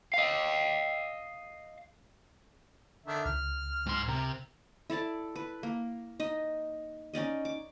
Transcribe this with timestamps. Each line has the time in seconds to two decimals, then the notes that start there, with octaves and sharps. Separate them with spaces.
0.14 D#5 F5
3.06 D3 D#3 E5
3.26 C#2 F6
3.86 G#2 C6
4.08 C3 A#4
4.90 E4 A4 D5 A5
5.36 B4
5.63 A#3
6.20 D#4 D#5
7.14 C#4 D#4 D5 D#5
7.45 D6